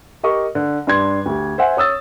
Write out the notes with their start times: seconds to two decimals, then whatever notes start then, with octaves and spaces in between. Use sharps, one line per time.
0.23 G4 A#4 D#5 C#6
0.55 D3
0.87 G2 D4 C6 G#6
1.26 D2 G4
1.58 C5 E5 F#5 G#5
1.77 C#5 D#6 E6 A6